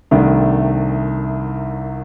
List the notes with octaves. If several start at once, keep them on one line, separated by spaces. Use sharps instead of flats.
C2 C3 D#3 A3 D4